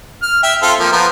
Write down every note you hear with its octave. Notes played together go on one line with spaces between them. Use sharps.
F6
E5 G5
C4 F4 A4
F3 A#3
F3 B3 A#4